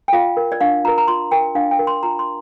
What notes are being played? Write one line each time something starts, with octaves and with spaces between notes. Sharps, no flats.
G5
F4 F5
A#4
D5
D4 F5
F4 A#4 A#5
A#5
F4 C6
A#4 G5
D4 F5
G5
A#4
C6
F4 A#5
C6